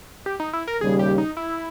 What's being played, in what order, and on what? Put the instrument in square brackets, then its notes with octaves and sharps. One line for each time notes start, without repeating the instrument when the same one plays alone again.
[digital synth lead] G4
D#4
E4
A#4
[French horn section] D#2 C#3 G3 [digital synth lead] G#4
[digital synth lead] G4
D#4
E4